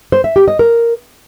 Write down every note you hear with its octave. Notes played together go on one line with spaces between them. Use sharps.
C5
E5
G4
D#5
A#4